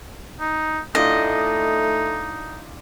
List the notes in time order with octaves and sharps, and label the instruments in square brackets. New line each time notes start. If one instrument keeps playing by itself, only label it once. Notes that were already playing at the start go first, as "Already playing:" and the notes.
[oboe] D#4
[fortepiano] A2 D4 F4 [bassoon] A3 [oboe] D#4 [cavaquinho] D#5